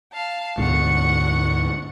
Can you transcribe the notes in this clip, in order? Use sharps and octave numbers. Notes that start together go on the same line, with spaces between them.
F5 A5
D2 G#2 B2 F#5 C#6